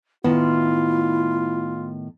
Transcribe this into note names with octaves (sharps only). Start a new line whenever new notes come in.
A2 D#3 B3 E4 F4 A5